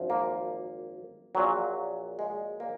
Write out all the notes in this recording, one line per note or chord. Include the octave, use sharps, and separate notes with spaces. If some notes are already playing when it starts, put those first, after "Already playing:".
Already playing: G#1 F#2 F3
A#3
A#1 A#2 F#3
G#3
A#3